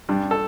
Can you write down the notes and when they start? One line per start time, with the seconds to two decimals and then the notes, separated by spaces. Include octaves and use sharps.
0.09 G2 G3 D4
0.31 A4